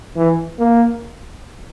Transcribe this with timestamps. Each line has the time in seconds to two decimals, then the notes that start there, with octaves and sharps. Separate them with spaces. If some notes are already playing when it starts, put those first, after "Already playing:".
0.16 E3
0.59 A#3